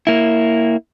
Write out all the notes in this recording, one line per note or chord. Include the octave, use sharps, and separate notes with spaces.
A#3 E4